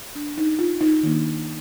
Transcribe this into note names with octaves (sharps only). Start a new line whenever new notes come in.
D4
D#4
F4
D#4
D#3 A#3 D4